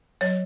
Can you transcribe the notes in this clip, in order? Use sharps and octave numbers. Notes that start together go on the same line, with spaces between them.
F#3 C#5